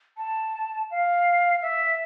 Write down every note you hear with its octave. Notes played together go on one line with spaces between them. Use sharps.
A5
F5
E5